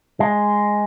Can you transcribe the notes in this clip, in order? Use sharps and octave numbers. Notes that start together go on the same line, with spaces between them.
G#3